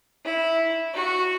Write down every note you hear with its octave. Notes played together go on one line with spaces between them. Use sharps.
E4
F#4